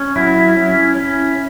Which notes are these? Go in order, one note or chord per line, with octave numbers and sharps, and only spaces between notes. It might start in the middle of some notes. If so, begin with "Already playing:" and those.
Already playing: C#4
F#3 E4
C#4
C#4